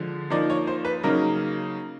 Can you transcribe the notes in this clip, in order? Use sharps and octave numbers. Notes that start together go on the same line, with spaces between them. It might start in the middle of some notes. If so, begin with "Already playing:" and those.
Already playing: D3 F3 G#3
F3 A#3 D#4 D5
C#5
C5
B4
C#3 F#3 A#3 D#4 A#4